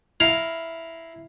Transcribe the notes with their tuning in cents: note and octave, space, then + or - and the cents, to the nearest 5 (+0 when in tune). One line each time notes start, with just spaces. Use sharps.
E4 +0 F5 +0 A#5 +0